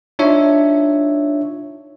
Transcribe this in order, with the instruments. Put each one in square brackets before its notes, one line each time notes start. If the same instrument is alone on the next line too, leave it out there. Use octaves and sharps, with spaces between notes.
[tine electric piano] D4 D#4 F4 C#5 E5